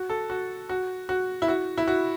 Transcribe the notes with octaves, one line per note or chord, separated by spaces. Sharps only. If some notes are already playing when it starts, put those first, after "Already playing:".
Already playing: F#4
A4
F#4
F#4
F#4
E4
F#4
E4
F#4